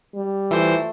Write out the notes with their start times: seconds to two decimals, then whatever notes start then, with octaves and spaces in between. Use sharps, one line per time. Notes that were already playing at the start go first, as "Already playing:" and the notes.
0.15 G3
0.51 E3 A3 F4 C5 E6